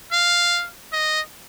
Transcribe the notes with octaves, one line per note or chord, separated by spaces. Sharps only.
F5
D#5